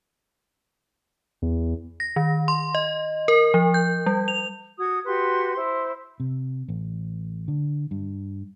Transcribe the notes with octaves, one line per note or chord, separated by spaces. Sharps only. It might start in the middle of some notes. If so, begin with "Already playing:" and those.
E2
A#6
D#3
C6
D#5
A#4
F3
G6
G3
F7
F#4 D#6 G#6
F#4 G4 B4 C6
E4 C5
C3
A1
D3
G2